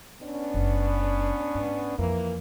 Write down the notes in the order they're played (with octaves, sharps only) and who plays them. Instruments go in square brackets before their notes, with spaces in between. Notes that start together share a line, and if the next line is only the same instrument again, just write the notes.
[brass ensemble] B3 C#4 D4
[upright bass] F#1
G#2
[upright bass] F2 [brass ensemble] E3 A#3